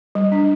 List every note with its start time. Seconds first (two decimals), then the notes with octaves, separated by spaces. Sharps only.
0.15 G3
0.32 D4